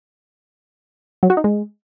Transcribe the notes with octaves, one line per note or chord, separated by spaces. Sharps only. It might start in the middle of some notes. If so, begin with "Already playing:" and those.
F#3
F#4
D#4
G#3